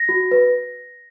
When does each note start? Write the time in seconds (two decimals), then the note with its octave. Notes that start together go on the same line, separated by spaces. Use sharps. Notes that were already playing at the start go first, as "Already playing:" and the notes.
Already playing: A#6
0.09 F#4
0.31 B4